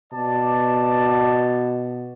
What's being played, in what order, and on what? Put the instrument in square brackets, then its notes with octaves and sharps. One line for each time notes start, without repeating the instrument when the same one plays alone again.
[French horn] B2 [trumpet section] D5 A5